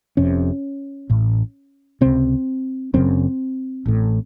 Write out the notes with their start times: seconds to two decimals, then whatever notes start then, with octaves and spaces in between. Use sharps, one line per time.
0.17 F1 F2 C3 C#4
1.09 A1 A2
2.01 C#2 C3 C4
2.94 F#1 F#2 C#3 C4
3.86 A1 A2